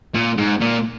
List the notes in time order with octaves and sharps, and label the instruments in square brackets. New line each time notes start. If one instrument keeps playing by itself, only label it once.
[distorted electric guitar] A#2
G#2
A#2